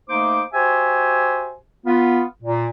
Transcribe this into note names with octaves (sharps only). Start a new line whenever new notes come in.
A3 A#3 D#4 C5 D6
F#4 G4 C5 E5 G#5
B3 F4
A#2